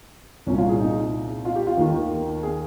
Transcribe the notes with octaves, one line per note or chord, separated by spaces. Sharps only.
C2 A#2 C#4
F4
G#4
D#4
F4
G4
F4
D#2 D#3
G#4